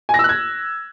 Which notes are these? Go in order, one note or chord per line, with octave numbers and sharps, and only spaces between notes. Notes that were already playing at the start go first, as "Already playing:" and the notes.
G#5
A#6
E6
F#6
G#6